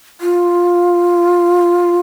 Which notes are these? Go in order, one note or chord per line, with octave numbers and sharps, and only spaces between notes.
F4